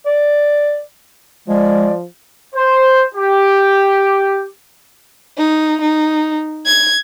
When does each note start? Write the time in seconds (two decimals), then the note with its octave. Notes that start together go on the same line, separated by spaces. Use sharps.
0.06 D5
1.48 F3 G#3 D5
2.55 C5
3.15 G4
5.38 D#4
5.81 D#4
6.66 G#6